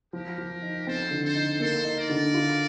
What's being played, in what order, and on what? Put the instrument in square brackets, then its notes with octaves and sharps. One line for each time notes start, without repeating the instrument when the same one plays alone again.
[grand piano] F3 [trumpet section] G4 A#4
[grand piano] F3
D#4
[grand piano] C4 [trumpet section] A4 C5
[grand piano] D3
[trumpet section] A4 C5
[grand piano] D#4
[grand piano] A#3 [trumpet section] A4 C5
[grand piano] D#4
[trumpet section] A#4 D5
[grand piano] D3
F4